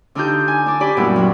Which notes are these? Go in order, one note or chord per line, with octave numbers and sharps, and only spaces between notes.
D3 D4 D#4 F4 G4 G6
G#5
D4 D5
C#4 G4 D5 B5
F#2 A#2 G3 B3 E4
F#3 G3